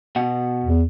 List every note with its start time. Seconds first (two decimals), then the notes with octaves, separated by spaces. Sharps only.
0.16 B2 F#5
0.64 E2